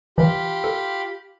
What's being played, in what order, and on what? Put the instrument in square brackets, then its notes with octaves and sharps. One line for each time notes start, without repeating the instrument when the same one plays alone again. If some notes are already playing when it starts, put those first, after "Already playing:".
[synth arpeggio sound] E3 [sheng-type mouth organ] F4 G4 B5
[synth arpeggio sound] A4